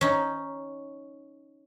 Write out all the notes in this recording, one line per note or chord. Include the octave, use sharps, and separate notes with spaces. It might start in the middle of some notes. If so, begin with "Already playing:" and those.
C#4 D#4